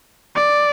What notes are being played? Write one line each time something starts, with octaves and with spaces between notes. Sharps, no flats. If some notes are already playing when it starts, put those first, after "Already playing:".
D5